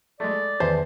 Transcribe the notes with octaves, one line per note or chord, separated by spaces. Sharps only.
G#3 A3 D5
E2 D#3 C5 E5 A5